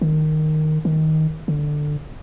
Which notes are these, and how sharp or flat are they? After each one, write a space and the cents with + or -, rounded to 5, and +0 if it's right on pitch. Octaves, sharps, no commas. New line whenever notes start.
D#3 -10
D#3 +10
D3 +10